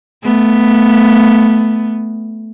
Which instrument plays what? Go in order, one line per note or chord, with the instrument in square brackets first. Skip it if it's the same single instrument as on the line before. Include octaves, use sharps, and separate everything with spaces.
[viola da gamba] A3 B3